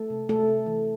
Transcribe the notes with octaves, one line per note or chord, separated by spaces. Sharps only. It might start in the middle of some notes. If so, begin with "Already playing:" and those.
Already playing: A3 A4
C3
C3 A3 A4
C3
E3